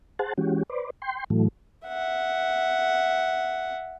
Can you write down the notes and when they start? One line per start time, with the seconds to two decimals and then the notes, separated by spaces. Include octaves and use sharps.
0.19 G#4 C5 F#5 A5
0.38 E3 G#3 C#4 F#4 G4
0.70 B4 C5 D5
1.02 G5 C6
1.30 A2 E3 F#3 A3
1.88 E5 F#5